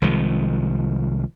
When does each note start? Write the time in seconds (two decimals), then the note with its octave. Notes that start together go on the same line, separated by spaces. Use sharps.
0.02 C2 D#3 F3 G#3